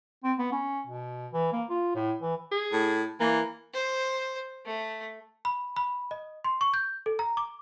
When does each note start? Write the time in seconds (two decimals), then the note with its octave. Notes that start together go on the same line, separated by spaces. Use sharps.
0.24 C4
0.38 B3
0.52 C#4
0.87 B2
1.33 E3
1.53 A#3
1.70 F4
1.95 A2
2.22 E3
2.52 G#4
2.73 A2
3.20 E3 A#3
3.74 C5
4.65 A3
5.45 B5
5.76 B5
6.11 D#5
6.44 C6
6.61 C#6
6.74 G6
7.06 A4
7.19 A#5
7.37 D6